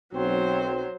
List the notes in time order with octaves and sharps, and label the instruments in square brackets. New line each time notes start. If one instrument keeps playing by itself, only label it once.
[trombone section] B1 C4 [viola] F#3 C5